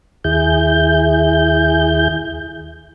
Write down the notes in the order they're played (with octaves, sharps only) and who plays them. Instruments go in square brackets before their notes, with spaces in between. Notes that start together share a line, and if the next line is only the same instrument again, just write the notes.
[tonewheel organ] D#2 E4 G#4 G6